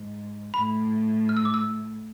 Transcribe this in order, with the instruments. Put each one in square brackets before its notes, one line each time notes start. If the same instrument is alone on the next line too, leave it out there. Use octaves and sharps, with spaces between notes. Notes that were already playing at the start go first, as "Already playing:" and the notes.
Already playing: [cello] G#2
[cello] A2 [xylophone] B5
[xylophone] F6
E6
D6
E6